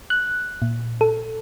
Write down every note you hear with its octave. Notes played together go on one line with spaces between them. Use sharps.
F#6
A#2
A4